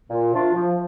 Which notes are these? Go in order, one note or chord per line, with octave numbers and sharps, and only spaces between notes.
A#2
F3 A3 D4 F4
F3